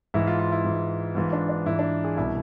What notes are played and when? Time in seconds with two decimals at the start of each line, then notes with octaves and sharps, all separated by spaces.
0.14 G#2 E3 E4
0.27 F4
0.39 F4
0.52 E4
0.64 G#2 E3
1.15 G#2 E3 F4
1.33 D4
1.49 D4
1.66 G#2 E3 E4
1.79 D4
2.04 G#4
2.17 C2 B2 E4